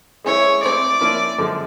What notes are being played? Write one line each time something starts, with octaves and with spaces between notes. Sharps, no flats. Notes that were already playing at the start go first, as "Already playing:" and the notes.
G#3 C#4 E4 G#4 C#5
A3 C4 E4 D5
F3 A#3 C#4 E4
F#2 D3 F3 G#3